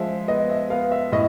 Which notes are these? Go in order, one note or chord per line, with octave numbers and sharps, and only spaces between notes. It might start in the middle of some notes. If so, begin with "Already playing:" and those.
Already playing: F3 G#3 E5
B3 D#5
E5
B3 F5
E5
A2 D#5